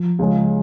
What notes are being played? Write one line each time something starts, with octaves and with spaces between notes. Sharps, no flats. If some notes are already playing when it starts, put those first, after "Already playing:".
Already playing: F3
C#2 C#3 G#3